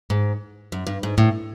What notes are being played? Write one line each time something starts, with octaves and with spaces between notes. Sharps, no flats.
G#2
F#2
G2
G#2
A2